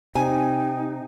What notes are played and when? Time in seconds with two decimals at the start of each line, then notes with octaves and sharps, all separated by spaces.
0.15 C3 D#4 G5 G#5